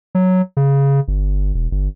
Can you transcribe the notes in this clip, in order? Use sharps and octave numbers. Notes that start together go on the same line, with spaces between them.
F#3
C#3
G1
E1
G1